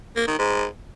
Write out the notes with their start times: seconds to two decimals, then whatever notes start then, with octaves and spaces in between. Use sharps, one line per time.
0.16 A#3
0.27 D#3
0.38 G#2